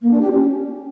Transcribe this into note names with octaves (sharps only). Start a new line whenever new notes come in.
A#3
D4
G4
C#4